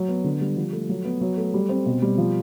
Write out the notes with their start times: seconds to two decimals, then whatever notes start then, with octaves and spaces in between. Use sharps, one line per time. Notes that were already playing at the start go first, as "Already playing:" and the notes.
Already playing: F#3
0.08 B3
0.24 D3
0.41 G3
0.57 F3
0.73 A3
0.89 F#3
1.05 B3
1.21 F#3
1.37 A3
1.54 G3
1.69 C4
1.86 B2
2.02 G3
2.18 F3